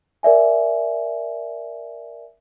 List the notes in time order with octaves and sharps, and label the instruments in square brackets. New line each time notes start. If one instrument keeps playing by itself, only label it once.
[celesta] A#4 D5 E5 G#5